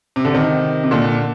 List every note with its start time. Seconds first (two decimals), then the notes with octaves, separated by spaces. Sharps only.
0.16 C3
0.25 D3
0.34 C3 D#3
0.84 C3
0.91 A#2 D3